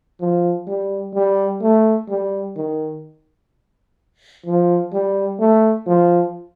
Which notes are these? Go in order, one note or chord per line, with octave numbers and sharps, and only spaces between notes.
F3
G3
G3
A3
G3
D#3
F3
G3
A3
F3